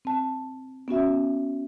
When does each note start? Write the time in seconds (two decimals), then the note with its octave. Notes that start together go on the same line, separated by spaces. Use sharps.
0.05 C4 A5
0.88 B3 C#4 F#4 E5